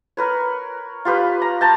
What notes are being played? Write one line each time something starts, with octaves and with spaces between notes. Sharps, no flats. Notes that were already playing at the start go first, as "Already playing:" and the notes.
A#4 B4 C#5
F4 G4 B4
A#5
G5 A5 A#5 C6